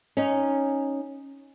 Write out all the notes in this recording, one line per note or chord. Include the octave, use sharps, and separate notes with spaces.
C#4 D#4